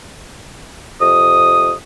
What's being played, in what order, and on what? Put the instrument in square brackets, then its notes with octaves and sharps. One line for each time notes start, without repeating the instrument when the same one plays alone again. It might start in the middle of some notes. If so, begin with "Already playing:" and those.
[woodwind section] F2 C3 D#6